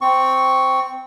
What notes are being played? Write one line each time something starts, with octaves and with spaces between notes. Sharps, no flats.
C4 C#6